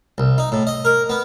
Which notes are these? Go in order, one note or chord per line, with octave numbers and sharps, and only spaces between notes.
C2
D#4
A2
D#5
A#4
B3